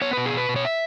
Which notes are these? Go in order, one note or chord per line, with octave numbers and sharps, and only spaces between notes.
B3 C#5
B2 B4
G#4
B2 B4
B2
C#5
E5